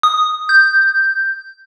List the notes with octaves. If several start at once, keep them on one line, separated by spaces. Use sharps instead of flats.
D#6
G6